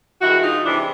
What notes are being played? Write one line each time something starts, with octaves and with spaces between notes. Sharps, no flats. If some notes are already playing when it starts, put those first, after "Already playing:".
G2 D#3 G#3 E4 F#4
D#4 F4
C3 E3 G#3 D4 E4